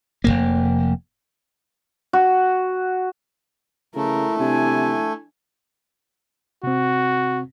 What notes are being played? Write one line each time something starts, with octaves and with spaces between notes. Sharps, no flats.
F1 D#2 A#3
F#4
C#3 A3 E4 A#4
C3 D4 G#5
C3 C4 F#4